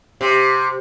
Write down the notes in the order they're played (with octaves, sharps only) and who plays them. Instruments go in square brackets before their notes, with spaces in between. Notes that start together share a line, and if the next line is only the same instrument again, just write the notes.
[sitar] C3